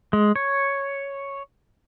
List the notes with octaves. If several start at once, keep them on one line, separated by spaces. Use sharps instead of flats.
G#3
C#5